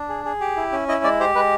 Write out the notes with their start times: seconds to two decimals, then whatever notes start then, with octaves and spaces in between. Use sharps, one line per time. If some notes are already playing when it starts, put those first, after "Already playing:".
Already playing: D4
0.09 G#4
0.25 G#4
0.40 G4
0.57 E4
0.72 C#4
0.88 E4 D#5
1.04 G#3 D5
1.20 G4 C5
1.35 G#3 B4